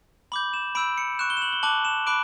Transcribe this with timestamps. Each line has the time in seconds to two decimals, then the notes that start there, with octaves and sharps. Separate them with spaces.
0.32 B5 D6 G6 F#7
0.53 E7
0.75 B5 E6 G6 D7
0.98 C#7
1.19 C#6 F#6 E7
1.30 G7
1.37 E7
1.42 F#7
1.53 G7
1.63 A5 D6 F#6 F#7
1.85 E7
2.07 B5 D6 F#6 D7